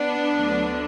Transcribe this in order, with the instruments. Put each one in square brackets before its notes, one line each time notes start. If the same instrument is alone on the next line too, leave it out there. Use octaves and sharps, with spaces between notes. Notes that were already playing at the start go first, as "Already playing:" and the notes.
Already playing: [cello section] B3 D4
D2 D3 F#3